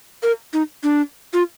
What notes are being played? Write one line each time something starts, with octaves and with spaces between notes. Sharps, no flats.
A#4
D#4
D4
F4